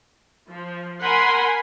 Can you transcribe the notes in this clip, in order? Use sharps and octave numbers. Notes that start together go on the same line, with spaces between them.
F3
A#4 F#5 G#5 B5 C6